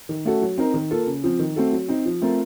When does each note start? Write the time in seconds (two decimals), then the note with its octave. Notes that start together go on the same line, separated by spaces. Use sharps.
0.09 D#3
0.25 A3 C#4 F#4 A4
0.42 F#3
0.58 C4 D#4 A#4
0.74 D#3
0.91 A#3 F4 A4
1.07 C#3
1.24 F3 C4
1.39 D#3
1.56 A3 C4 F#4 A4
1.73 F#3
1.89 C4 D#4
2.06 F3
2.22 A3 C4 F4 A#4